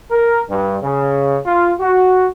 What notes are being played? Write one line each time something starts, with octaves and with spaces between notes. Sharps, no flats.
A#4
G2
C#3
F4
F#4